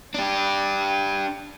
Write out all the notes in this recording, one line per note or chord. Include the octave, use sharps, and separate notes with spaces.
D4 G4